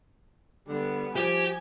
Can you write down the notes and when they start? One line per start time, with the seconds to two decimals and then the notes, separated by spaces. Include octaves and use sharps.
0.68 D3 G3 B3
1.16 F3 G4 G#5